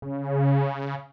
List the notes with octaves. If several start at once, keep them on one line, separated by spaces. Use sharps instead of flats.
C#3